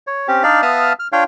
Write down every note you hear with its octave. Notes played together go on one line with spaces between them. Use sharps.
C#5
C4 C#4 G4
D4 D#4 D5 F5
B3 E5 F5 A5 D#6 F6
F6
D4 F4 C#5 F5 G5